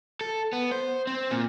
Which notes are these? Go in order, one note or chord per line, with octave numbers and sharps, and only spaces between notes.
A4
B3
C5
C4
A#2